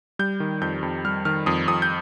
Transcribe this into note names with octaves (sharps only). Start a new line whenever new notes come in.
G3 G6
D#3
F2 G6
F2
G3 F6
D#3 F6
F2 D#6
F2 D#6
G6